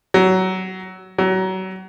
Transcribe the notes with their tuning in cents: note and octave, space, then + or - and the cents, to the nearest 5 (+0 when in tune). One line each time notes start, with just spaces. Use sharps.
F#3 +20
F#3 +30